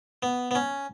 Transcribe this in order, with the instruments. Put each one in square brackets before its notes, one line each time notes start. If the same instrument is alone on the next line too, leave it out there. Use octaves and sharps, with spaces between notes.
[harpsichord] B3
B3
C#4